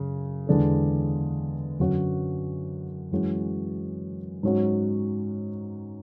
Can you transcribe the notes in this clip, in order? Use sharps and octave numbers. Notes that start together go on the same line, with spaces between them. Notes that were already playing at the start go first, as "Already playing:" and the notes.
Already playing: F#2 C#3
E2 D3 G#3 D4 A4
F#2 D3 F#3 C#4 F#4
F#2 E3 G#3 C#4 F#4
G#2 F#3 C#4 F#4